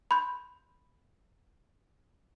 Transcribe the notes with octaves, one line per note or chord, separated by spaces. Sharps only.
B5 C6 G6